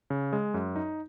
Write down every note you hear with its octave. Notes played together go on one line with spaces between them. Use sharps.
C#3
G#3
F#2
D#4